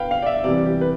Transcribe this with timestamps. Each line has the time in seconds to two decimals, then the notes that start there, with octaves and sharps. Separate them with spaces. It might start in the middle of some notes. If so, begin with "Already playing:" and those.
Already playing: B4 F5 G5
0.11 F5
0.22 D5
0.26 E5
0.44 C3 E3 G3 D5
0.66 G4
0.81 B4